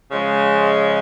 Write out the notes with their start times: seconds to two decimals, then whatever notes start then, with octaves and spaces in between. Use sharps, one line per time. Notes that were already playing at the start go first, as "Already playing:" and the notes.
0.10 C#3 F3 G#3